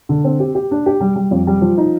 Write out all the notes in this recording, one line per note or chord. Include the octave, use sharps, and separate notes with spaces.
D3
C4
G4
G4
D4
G4
G3
G3
F2
G3
F3
D#4